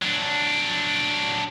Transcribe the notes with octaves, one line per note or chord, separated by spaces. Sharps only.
F#3 D4